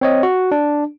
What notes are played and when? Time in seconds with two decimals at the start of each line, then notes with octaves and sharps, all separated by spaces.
0.01 C4 C#5 D#5
0.23 F#4
0.52 D4